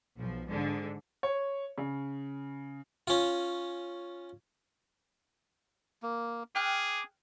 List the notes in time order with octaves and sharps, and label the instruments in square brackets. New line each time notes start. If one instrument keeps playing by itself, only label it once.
[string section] B1 F3
G#2 D3
[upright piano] C#5
C#3
[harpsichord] C#4 F4
[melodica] A#3
[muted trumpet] G#4 [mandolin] G5 F6 F#6 [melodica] D6